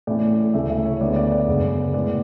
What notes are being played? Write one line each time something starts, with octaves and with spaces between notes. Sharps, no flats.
A2 E3 A3 C#4 D5
D2 C#3 E3 A3 C#4 E5
E5
C#5
D2 D3 G#3 B3 D5
D5
D5
F#2 C#3 G#3 B3
A2 G#3 B3 D5